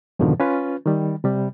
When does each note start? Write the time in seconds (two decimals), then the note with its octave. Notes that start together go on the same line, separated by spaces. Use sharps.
0.19 F2 G#2 B2 D3 D#3 F3
0.40 C#4 F4 B4
0.86 D#3 G3
1.24 C3 G3